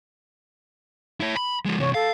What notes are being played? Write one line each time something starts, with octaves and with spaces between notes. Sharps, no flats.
E4 C#5
B5
F3 G#3
C3 E3 C#5
A4 F5